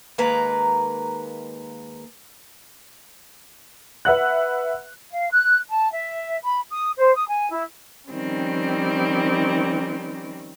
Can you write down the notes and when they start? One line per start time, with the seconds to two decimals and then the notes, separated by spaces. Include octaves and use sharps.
0.18 D#2 G#3 A#3 B4 A#5
4.05 B4 E5 F#5 F#6
5.11 F5
5.32 F#6
5.69 A5
5.92 E5
6.45 B5
6.70 D#6
6.97 C5
7.16 D#6
7.28 G#5
7.51 E4
8.10 D#3 F3 G3 C4 C#4